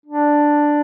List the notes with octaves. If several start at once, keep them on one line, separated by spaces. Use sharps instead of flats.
D4